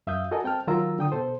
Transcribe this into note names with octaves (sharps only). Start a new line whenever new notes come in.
F#2 E5 F5 D#6 G6
F#4 A4 A#4 D#5 G#5
C4 G5 A5 F6
D#3 F#3 F4 A#4 A#5 E6
D3 G5 D#6
B2 A4 C5